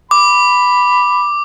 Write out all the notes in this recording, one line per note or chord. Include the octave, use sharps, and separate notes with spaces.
B5 D6